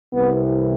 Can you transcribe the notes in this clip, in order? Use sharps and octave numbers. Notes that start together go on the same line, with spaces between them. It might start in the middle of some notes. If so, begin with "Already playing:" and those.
C2 C3 E3 B3